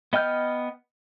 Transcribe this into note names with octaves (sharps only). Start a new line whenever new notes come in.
B3 D#5 G5 F6 G6